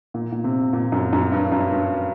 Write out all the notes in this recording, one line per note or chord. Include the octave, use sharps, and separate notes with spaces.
A#2
A#2
C3
A#2
F#2
F#2
G2
F#2
G2